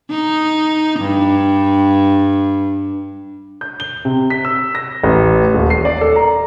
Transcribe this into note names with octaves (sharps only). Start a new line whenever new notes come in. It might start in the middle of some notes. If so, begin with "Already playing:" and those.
D#4
G2
G6
G7
C3
B6
E6
A#6
A1
D#1
C7
D5
A4
A#5